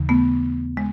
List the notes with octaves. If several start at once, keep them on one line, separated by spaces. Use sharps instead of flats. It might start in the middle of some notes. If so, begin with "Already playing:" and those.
Already playing: D#2 C#3 E3
A3 B3
G#3